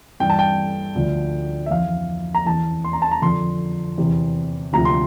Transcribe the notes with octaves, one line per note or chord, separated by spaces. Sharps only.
G2 E3 G5
A5
G5
D2 D3 F3
E5
F2 E3 F5
A#5
E2 E3 A5
C6
A#5
A5
A#5
F2 D3 F3 C6
E2 C3 E3
D2 C3 F3 A#5
C6